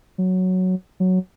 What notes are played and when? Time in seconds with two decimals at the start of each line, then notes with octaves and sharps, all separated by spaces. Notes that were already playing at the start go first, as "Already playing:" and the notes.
0.18 F#3
1.00 F#3